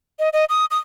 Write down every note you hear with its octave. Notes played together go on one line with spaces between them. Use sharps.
D#5
D#5
D#6
D#6